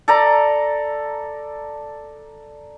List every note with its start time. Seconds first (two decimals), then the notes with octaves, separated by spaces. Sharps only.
0.08 A4 D5 A#5